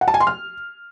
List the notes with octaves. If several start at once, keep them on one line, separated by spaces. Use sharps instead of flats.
F#5
A5
G#5
C6
F6